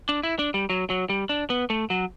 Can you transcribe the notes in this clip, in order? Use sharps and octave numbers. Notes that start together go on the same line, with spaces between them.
D4
E4
D4
G3
F#3
F#3
G3
D4
B3
A3
F#3